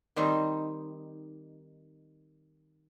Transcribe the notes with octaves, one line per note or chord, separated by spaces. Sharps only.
D#3 G3 C4 D#4